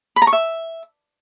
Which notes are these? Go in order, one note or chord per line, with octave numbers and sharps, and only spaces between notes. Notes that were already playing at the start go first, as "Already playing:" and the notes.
B5
A#5
C#6
E5